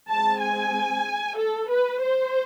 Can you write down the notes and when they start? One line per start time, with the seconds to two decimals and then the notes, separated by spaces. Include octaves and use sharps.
0.11 G#3 C4 A5
0.42 G#5
1.38 A4
1.70 B4
2.02 C5